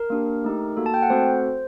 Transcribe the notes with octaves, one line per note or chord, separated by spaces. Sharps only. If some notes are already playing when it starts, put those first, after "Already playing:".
Already playing: A#4
A#3 D4 G4
A3 D#4 G4
A#3 F#4 A4
A5
G5
F#5
A3 C4 F#4 A4 C5